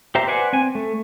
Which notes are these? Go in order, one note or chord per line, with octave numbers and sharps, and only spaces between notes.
G4 C5 E5 A#5
B4 C5 D5 F#5 G#5
C4 G#5
A3